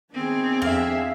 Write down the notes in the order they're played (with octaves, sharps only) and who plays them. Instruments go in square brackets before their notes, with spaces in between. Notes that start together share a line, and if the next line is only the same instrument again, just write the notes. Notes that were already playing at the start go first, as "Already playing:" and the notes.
[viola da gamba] D#3 B3 C4 [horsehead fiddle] D4 G#4
[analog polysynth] F2 E5 [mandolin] F5